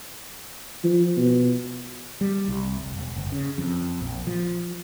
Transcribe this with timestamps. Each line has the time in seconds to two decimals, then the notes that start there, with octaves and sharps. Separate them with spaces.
0.84 F3
1.17 B2
2.21 G3
2.48 C2
2.77 F1
2.97 E1
3.16 F#1
3.32 C#3
3.58 F2
4.00 A#1
4.27 F3